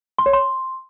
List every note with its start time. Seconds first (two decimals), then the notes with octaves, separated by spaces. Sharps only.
0.19 C6
0.26 C#5
0.33 C6